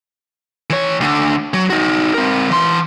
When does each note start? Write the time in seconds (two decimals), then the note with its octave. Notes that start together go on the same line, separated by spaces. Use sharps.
0.70 E3 C#5
1.00 D2 D3
1.54 F#3
1.70 D#4 F#4
2.14 C4 A#4
2.51 E3 C6